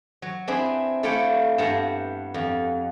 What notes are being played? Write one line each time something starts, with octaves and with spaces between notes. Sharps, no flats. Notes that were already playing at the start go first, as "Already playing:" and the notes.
F#3
C4 D4 E4 G#4 B4
A3 E4 F4 C#5 D5 G5
G2 B3 F#5 A5 A#5
F2